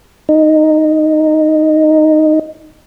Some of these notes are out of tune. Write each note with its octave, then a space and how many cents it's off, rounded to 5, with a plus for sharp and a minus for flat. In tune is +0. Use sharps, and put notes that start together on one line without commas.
D#4 -5